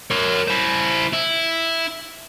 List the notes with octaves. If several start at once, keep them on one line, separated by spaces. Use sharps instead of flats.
A#4 C#5
E4 C5
E4